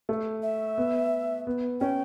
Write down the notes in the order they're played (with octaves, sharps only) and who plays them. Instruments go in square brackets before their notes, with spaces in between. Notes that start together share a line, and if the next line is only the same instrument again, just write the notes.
[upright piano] A3
[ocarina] E5
[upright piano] B3
B3
[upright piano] C#4 [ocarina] G5